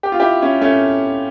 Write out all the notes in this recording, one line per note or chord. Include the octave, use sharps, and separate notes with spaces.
G4
F4
E4 G4
C#4 E4
A3 C#4